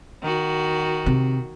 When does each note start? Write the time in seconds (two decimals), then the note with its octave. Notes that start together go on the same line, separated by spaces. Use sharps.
0.22 D#3 F#4
1.06 C3